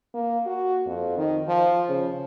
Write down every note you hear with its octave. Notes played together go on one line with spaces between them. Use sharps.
A#3
F#4
F2
D#3
F3
C#3